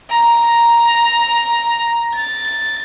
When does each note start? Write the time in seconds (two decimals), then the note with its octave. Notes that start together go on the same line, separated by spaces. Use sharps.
0.10 A#5
2.14 A6